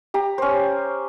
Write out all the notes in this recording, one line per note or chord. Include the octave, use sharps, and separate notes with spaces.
G4 A#5
C#4 C5